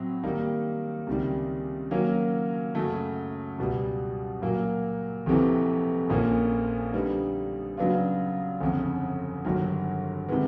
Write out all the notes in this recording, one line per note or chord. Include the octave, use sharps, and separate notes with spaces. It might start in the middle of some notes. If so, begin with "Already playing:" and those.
Already playing: A2 F#3 C4
D#3 G3 A#3 D#4
C#2 C3 D#3 G3
D#3 F#3 A#3 C#4
F#2 C#3 F#3 A3
C#2 B2 G3
A#2 F#3 A#3
F1 F2 C3 E3
A#1 A#2 F3 A#3 C#4
D3 G3 B3 D#4
C#3 F#3 B3 D4 F4
G1 F2 C#3
G1 G2 D#3 F#3
C3 D#3 G#3 B3